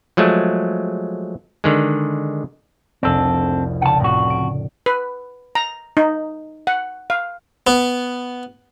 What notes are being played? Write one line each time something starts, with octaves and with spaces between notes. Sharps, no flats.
F3 F#3 G#3 A3
D3 D#3 G#3
F1 C2 C4 D4 A4 D5
C#2 D5 F#5 A5
F2 A2 F#4
D7
B4
A#5
D#4
F#5
F5
B3